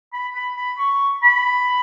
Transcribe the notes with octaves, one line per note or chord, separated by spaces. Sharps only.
B5
B5
B5
C#6
B5